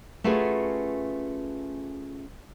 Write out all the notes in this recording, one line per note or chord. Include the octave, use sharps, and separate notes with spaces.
A3 C#4 F4 F#4 G#4 B4